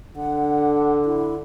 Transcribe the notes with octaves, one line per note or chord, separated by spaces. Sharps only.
D3 F#5
E4